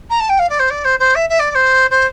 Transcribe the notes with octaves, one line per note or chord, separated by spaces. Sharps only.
A#5
A5
G5
F5
D5
C5
D5
C5
C5
E5
E5
D5
D5
C5
C5